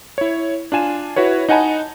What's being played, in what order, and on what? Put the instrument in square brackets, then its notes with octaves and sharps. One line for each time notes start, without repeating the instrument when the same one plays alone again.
[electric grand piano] E4 C#5
D4 F4 G#5 E7
E4 F#4 B4 C#5
D#4 D#5 F#5 G#5 A5 B5